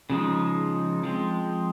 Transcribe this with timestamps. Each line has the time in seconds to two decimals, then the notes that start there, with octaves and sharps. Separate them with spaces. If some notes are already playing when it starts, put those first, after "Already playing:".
0.10 C#3 F3 G#3 D#4
1.03 F3 G#3 C4